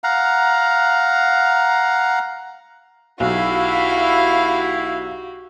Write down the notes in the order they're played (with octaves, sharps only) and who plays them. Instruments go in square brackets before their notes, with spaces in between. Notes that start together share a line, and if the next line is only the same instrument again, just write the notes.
[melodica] F5 F#5 A#5
[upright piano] B1 [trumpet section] E4 [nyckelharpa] F#4 G4 [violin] F5